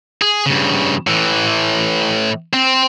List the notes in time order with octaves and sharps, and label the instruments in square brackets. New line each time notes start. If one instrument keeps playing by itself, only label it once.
[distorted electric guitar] G#4
G2 C#3
A2 E3
C4